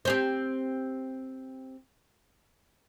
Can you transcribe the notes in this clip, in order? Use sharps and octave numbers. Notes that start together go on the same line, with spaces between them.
C4 G4 C5